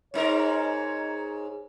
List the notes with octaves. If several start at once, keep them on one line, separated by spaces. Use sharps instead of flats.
G#2 D#4 A#4 C#5